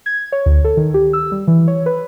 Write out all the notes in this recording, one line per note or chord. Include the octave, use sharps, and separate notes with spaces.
G#6
C#5
D2
A4
D#3
G4
E6
G3
E3
C#5
B4